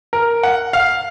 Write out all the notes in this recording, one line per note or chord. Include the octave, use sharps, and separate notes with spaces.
A#4
F#5
F5